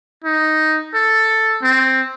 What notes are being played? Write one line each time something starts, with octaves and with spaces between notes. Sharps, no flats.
D#4
A4
C4